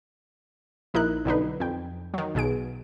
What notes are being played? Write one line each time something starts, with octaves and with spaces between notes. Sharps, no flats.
A#1 D#4 E4 A#4 F#6
B1 D3 D#4 B4
F2 G5
D#3 F#3
B1 B2 G#4 D7